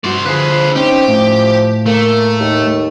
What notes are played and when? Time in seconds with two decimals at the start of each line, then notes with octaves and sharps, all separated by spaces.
0.04 G2 F#4 C5 D5
0.25 D3 F3 G#4 B4 C5
0.75 C4 C#4 D#4 G4
1.08 A2 F3
1.86 A3 A#3
2.40 D#2